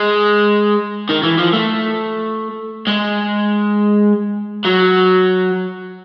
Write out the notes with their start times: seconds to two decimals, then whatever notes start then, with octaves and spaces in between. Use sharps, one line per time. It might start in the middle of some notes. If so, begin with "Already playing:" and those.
Already playing: G#3
1.09 D#3
1.23 E3
1.38 F3
1.54 A3
2.87 G#3
4.65 F#3